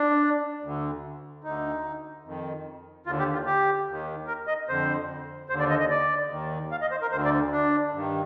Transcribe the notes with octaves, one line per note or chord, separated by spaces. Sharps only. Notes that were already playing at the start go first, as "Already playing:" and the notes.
Already playing: D4
D2 D3
D2 D3 D#4
F2 D#3
D#2 D3 F4
G4
F4
G4
D#2 D#3
A#4
D#5
F2 D3 C5
D#2 D3 C5
D5
D#5
D#5
D5
D#2 D#3
F5
D#5
C5
A#4
D2 D3 C5
D5
D4
G2 D#3